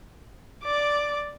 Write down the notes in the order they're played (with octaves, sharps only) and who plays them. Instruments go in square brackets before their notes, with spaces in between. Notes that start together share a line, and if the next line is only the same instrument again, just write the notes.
[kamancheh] D5 D6